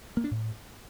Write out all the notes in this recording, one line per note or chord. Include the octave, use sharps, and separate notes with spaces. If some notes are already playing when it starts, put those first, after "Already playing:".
A#3
D4
A2